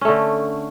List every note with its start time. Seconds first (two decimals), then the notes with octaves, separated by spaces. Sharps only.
0.01 C#4
0.05 A3
0.08 D3